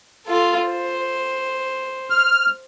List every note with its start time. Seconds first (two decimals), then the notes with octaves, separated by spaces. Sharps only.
0.27 F4 A4
0.67 C5
2.10 F6